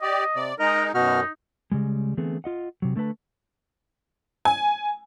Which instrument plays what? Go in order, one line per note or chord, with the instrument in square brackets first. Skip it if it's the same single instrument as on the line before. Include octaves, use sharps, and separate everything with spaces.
[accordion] G4 D5 [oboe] D#5
[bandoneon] C3 [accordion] D5
[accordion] G#3 D#4 [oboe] A#4 [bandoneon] D#5 A#5
[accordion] F#2 [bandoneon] B2 F#4 F6 [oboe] D#4
[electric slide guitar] C#3 G3 G#3
D3 E3 A3 B3 C4 G#4
F4 D#5 F#5
C3 F#3
D3 A3 A4 B4 A5
[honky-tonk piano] G#5